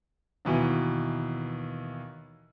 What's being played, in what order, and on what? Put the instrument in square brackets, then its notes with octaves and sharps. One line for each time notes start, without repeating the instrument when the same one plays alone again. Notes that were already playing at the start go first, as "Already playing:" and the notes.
[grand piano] D#2 B2 E3